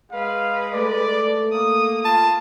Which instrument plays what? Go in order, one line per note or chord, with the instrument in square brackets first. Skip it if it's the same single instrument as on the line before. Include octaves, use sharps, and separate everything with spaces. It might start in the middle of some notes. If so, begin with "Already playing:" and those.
[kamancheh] G#3 B4 [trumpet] F5
[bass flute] A3 [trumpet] D5
[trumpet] A#3 [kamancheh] D#6
[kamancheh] F4 [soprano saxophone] A5